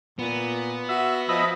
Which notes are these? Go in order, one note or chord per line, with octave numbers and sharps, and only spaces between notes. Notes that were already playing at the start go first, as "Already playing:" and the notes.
A#2 B3
F#4 E5
F3 D#5 E5 B5